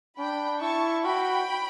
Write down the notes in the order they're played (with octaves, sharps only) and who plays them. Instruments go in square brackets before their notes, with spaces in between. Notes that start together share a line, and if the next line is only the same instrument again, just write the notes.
[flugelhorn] D4 [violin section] G5 B5
[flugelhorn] E4 [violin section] A5 C#6
[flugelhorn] F#4 [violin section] G5 B5